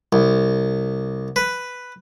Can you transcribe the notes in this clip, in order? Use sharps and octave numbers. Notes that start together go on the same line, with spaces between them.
C2
B4